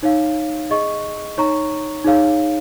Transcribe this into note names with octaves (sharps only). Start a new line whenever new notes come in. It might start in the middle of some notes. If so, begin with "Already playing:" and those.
D#4 C#5 F5
G#4 D#5 C#6
D#4 C#5 A#5 C#6
D#4 G#4 C#5 F5